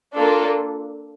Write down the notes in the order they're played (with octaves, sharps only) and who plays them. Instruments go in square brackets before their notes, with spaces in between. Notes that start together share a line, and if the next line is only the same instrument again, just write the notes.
[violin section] A#3 D4 F4 A4